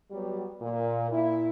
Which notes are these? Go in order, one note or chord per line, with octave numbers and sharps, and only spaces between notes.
F#3 G3 B3 G4
A#2
A#2 E4